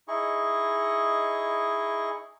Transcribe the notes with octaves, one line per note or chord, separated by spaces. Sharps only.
D#4 E4 G#4 D#5 C#6